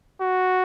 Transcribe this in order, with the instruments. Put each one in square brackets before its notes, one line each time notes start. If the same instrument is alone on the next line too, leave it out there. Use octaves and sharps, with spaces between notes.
[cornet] F#4